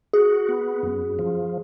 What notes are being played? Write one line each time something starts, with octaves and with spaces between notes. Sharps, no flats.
F#4 G#4
B3
F#2
F3